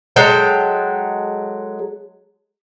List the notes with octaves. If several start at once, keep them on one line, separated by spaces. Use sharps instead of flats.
F#3 G#3 A4 G5